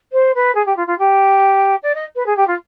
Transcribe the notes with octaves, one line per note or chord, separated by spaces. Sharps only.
C5
B4
G#4
G4
F4
F4
G4
D5
D#5
B4
G#4
G4
F4